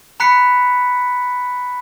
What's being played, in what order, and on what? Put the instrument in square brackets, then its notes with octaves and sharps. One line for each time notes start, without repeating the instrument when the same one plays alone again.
[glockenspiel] A#5 B5 F#6 B6 C#7